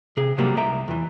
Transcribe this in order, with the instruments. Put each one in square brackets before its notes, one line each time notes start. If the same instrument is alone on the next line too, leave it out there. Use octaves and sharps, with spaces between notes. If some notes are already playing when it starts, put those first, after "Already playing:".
[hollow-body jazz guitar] C3 G#4
C3 F#3 G3 A#3
C2 D#5 E5 G5 A#5
E2 E3